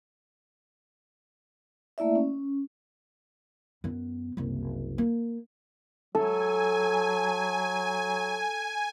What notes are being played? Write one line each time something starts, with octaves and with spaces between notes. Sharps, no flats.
A3 A#3 E4 D5 E5
C#4
F#2 B3
F#1 C2
A#3
F#3 A4 G#5